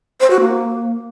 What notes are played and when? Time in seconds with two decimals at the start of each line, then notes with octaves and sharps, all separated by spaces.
0.21 C5
0.31 F#4
0.41 A#3